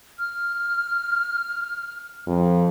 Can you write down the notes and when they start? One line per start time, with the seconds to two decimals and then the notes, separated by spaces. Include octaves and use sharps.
0.18 F6
2.27 F2